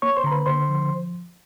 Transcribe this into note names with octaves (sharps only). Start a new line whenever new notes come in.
A#3 C#5 C#6
C5 C6
D3 A#5
B4 B5
D3 C5 C6
F3